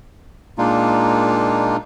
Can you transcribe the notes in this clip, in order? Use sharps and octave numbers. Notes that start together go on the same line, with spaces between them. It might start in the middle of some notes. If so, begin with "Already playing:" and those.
A#2 G#3 A#3 D4 D#4 F4